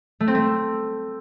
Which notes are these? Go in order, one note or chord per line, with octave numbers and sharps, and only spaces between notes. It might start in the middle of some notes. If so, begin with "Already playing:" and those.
A3
C4
A3